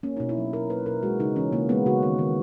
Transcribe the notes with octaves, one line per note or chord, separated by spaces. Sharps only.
A#3 C#4
B2 D#4
E4
F#3
B2 A#4
A#3 B4
B2 A#4
G#3 F#4
C#3 D#4
E3 C#4
C#3 A#3
G#3 B3
C#3 F#4
D#3
D#3